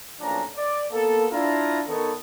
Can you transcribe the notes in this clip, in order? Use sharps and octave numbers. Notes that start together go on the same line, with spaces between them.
B1 F3 A#3 C#4 D4 A#5
D5
A#3 B3 A4
D4 E4 F4 A#5
D#3 B3 A4 C#5